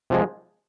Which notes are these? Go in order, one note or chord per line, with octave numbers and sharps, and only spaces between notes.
C3 F3 G#3